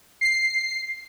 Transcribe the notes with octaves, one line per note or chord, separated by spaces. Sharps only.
C7